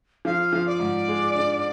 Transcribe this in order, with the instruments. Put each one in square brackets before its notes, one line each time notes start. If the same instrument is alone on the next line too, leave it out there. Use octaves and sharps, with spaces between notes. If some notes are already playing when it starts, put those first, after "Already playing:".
[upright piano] F3 [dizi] F5
[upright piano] F3
[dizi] D5
[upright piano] G#2
G#3
D4